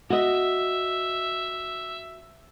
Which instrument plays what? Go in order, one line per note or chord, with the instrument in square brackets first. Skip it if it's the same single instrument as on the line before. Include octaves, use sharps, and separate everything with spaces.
[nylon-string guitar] F#4 D#5 [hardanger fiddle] E5